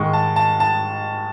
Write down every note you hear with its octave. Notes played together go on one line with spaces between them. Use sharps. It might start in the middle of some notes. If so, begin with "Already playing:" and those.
Already playing: G#2 D#3 G#3 C#6
A5
A5
A5